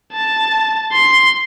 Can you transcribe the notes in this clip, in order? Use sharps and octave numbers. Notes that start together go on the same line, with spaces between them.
A5
C6